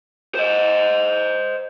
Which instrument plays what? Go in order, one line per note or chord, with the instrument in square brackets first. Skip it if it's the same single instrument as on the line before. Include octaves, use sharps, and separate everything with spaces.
[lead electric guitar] C5 D#5